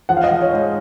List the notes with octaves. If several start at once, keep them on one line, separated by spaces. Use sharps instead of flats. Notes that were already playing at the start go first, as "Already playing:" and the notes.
F3 F#5
F5
D#5
F3 F5
C#5
G#2